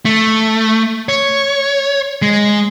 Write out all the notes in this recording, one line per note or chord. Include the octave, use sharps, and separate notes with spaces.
A3
C#5
G#3